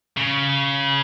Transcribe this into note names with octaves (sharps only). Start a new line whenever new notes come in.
C#3